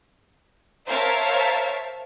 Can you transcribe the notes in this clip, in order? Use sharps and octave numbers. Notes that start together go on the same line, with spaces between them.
A#4 C5 C#5 E5 F5 A5